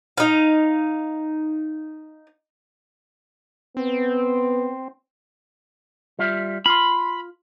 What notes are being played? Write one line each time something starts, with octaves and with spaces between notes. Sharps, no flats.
D#4 F5
B3 C4
G3 F4 E5
F4 B5 C6